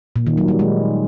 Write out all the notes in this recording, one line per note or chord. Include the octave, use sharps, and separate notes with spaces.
A#2
D#3
F#3
G3
G#3